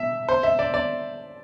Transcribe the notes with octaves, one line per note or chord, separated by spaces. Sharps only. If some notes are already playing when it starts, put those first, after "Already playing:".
Already playing: E5
C5
E5
D5
D5